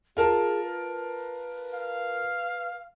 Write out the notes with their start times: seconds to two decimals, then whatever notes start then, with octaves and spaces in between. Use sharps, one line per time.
0.17 F4 G#4 A#4 A5
0.63 B4
1.73 F5